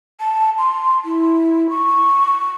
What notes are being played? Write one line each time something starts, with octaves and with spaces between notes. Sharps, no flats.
A5
C6
E4
C#6